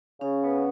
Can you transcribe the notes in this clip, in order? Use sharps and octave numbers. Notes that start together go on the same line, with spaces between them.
C#3 C#4
B3